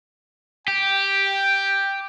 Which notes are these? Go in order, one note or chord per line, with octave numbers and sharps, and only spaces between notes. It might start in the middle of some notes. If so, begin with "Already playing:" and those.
G4 G5